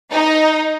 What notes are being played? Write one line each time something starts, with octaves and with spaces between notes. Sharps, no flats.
D#4